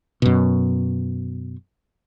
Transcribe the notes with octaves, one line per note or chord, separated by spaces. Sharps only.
F#2 B2